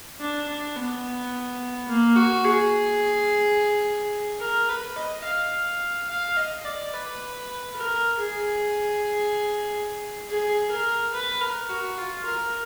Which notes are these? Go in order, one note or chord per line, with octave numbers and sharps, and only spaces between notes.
D4
D4
B3
A#3
F#4
G#4
A#4
B4
D#5
F5
F5
D#5
D5
B4
A#4
G#4
G#4
A#4
B4
A#4
F#4
F4
A#4